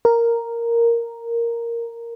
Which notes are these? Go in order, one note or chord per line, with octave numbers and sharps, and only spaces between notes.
A#4